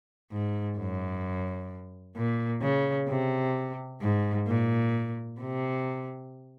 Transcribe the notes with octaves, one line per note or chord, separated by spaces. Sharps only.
G#2
F#2
A#2
C#3
C3
G#2
A#2
C3